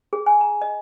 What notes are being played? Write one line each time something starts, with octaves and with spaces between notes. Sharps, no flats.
G#4
G#5
A#5
D#5